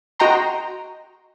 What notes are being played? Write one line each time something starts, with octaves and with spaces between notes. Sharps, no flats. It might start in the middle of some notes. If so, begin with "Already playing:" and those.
F#4 D#5 G5 A#5 C6